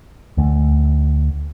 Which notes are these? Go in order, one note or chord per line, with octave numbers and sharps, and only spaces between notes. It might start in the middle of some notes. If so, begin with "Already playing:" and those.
D2 D3 A3